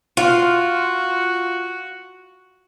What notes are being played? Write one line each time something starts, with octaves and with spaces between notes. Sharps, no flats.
F4 F#4